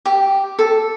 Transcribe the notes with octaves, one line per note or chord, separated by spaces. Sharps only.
G4
A4